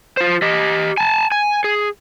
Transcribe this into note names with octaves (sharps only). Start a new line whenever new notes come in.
F4 C5
G4 D#5
G#5 A5
G#5
G#4